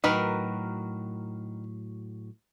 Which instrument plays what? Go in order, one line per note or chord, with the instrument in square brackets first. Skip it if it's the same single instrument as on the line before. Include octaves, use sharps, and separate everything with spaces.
[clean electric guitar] A2 F#3 F#4 [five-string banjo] D#3 A#4 B4